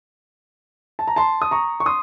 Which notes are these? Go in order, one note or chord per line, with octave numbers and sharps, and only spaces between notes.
A5
A#5
A5 C6
D#6
A#5 C#6
C#6
C6 D#6